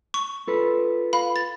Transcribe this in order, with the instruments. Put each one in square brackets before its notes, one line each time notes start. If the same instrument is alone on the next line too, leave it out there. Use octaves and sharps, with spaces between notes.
[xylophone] C#6
[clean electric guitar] F4 A4 B4
[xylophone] F5 B5
A6